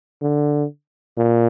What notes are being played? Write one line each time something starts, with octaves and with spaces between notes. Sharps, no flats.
D3
A#2